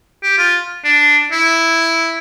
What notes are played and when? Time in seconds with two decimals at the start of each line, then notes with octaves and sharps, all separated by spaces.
0.23 G4
0.38 F4
0.85 D4
1.32 E4